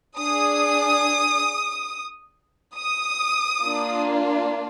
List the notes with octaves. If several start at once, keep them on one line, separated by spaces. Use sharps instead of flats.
D4 G#4 D#6
D#6
A#3 D4 F4